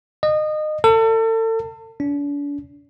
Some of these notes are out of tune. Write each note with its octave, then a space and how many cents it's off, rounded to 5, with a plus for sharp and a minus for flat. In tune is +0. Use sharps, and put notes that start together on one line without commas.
D#5 -25
A4 +35
D4 -40